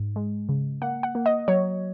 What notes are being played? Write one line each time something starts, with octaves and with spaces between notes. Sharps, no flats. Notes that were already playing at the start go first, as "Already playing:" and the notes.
Already playing: G#2
G#3
C#3
A#3 F#5
F#5
A#3
D#5
F#3 C#5